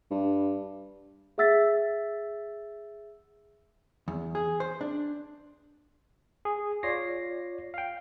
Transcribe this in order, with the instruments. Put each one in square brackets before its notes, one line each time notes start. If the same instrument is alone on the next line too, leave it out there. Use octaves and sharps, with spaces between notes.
[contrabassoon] G2
[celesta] G#4 E5 F#5 E6 A6 B6
[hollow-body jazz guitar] E2
G#4
C5
D4
[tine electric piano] G#4
F4 C#5 D5 A#6 C7
F5 G5